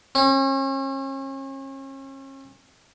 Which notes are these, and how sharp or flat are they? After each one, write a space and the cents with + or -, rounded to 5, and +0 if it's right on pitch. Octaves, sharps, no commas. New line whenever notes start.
C#4 -40